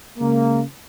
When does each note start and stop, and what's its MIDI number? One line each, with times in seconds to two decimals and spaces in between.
0.19 0.61 49
0.19 0.61 56
0.19 0.61 58